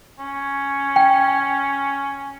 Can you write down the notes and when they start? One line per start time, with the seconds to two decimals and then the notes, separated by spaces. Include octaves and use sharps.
0.19 C#4
0.96 G5